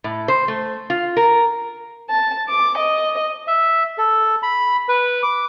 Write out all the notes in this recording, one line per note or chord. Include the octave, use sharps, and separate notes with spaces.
A2
C5
A3
F4
A#4
A5
D6
D#5
E5
A4
B5
B4
D6